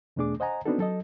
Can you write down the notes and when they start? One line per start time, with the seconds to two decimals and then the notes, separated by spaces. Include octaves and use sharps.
0.16 E2 B2 A3 D4 G#4 D6
0.40 C5 D#5 F#5 G#5 A#5
0.66 B3 C4 D4 D#4 F#4 A4
0.78 F#3 A4 D#5